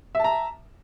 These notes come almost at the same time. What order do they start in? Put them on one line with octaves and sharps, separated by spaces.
E5 A5 A#5